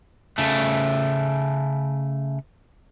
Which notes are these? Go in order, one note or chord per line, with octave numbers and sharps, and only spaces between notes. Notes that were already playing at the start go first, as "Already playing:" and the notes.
C#3 A3